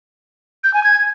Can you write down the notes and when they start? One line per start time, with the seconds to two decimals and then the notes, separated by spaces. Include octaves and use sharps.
0.64 G6
0.74 G#5
0.84 G#6